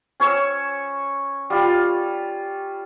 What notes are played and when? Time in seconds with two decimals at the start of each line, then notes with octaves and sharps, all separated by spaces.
0.20 C#4 C#5 C#6 E6
1.50 G3 F4